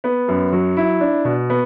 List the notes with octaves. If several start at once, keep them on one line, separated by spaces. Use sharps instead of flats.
B3
F#2
F#3
E4
D4
B2
B3